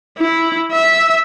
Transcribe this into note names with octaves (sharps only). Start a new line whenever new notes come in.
E4
E5